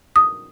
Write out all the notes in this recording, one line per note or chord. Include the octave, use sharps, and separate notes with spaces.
D#6